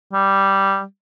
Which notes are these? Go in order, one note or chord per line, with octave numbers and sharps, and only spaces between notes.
G3